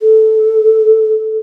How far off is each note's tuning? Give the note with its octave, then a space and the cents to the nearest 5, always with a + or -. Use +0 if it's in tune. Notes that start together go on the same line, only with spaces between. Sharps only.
A4 -10